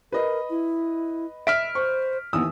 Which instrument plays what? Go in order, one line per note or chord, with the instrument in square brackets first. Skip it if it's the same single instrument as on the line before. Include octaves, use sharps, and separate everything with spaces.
[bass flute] A#4 [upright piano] B4 D#5
[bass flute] E4
[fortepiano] E5 [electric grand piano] F6 B6 D7
[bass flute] C5 [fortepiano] C#6
[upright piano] D#2 E3 E6 [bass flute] B3 [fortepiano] D#6